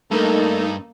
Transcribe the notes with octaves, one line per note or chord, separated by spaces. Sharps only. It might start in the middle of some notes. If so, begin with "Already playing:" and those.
G2 A3 A#3 D#4 A4